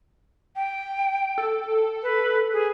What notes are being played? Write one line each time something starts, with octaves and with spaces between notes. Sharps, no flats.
G5
A4
B4
G#4